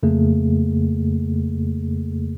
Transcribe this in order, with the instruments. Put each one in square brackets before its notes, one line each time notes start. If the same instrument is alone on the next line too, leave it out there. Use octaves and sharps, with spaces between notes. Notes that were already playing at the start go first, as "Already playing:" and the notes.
[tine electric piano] F2 C#3 A3 A#3 G#4